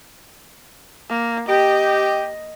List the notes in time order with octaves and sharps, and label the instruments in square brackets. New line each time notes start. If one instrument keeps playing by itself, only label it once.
[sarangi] A#3
[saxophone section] G4 [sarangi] D#5